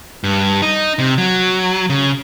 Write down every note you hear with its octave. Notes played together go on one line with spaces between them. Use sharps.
G2
D#4
C3
F#3
C#3